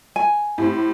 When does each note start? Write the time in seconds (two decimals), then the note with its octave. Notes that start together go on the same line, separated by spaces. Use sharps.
0.16 G#5
0.58 A2 G3 C4